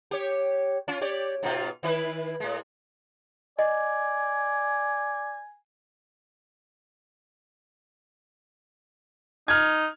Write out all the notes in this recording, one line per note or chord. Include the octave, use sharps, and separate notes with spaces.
G4 C#5
C#4 F4
G4 C#5 D5
G#2 B2 F4
D#3 E4 B4
A2 G#3
D5 D#5 G#5
D#4 F6 G#6